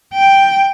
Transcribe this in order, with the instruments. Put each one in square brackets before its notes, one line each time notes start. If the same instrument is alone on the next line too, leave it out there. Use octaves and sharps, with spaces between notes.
[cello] G5